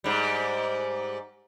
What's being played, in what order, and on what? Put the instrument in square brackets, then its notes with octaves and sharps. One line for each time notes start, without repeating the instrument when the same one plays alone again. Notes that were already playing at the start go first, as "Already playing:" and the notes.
[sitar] G#2 G3